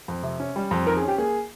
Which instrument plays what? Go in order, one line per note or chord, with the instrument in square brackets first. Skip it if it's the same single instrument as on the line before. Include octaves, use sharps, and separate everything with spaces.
[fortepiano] F2
C3
C#4
G3
F2
[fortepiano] D#3 [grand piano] A#4
[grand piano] G#4
[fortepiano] C#4
[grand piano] G4
[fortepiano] A#3 [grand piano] G#4